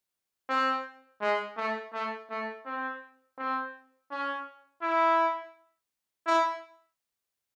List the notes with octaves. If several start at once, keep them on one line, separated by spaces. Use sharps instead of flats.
C4
G#3
A3
A3
A3
C4
C4
C#4
E4
E4